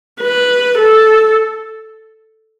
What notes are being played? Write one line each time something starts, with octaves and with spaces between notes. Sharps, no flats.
B4
A4